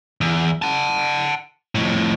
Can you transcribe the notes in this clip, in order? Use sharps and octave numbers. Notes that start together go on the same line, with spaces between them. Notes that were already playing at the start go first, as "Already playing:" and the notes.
E2
F#5 A5
F2 A2